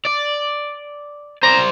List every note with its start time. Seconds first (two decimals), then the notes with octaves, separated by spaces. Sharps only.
0.05 D5
1.43 C5 D5 A#5